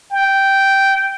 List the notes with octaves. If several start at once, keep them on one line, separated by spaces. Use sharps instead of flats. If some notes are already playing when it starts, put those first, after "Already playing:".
G5